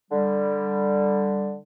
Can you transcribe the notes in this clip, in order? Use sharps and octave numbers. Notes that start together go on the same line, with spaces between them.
D3 G3